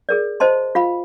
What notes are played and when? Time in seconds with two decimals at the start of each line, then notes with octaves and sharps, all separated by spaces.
0.09 G#4 A#4 D5
0.40 C5 D#5 A5 C6
0.75 F4 F5 B5